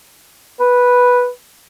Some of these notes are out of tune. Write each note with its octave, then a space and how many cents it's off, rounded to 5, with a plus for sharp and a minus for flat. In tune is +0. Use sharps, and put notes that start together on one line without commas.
B4 -5